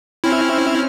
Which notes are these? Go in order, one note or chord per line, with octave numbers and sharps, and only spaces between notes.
C4 C#4 E4 F6